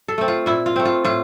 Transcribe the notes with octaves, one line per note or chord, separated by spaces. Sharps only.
A4
A3 C4
F4
A#2 E4
F4
A3 C4
F4
A2 F4